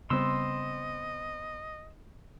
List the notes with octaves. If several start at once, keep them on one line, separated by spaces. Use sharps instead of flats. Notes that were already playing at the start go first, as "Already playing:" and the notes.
C#3 G3 B3 C4 D#5 C6 E6